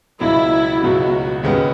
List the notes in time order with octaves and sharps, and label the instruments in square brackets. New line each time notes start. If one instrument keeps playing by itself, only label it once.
[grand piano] C#2 B2 F#3 [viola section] E4
[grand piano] C#2 B2 F#3 [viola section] F#4
[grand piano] D#2 C#3 G#3 B3